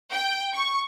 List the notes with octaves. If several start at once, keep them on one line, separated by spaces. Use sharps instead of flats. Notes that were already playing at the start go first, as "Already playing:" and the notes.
G5
C#6